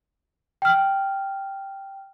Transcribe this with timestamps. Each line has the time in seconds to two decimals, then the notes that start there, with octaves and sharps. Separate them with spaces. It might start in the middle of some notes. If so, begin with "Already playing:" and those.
0.62 G5 F6